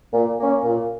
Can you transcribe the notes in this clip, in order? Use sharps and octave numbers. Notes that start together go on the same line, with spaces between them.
A#2
A#3 C#4
A#2